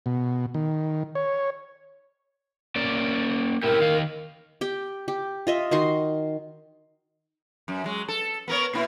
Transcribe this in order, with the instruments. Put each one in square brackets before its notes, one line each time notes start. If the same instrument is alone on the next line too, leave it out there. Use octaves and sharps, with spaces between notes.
[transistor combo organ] B2
D#3
C#5
[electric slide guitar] A#3 C#4 D5
[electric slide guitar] A2 E4 G4 [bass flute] A#4
[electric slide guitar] D#3 F5
[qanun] G4 G5
G4
F4 D#5 E5
D#3 F#4 C6
[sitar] F#2
F#3 G#3
A4
B3 A#4 C#5
B2 A#3 E4